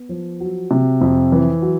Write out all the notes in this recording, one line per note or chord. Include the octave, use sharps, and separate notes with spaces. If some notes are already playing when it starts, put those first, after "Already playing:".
Already playing: B3
F3
F#3
C3
F2
E3
F#3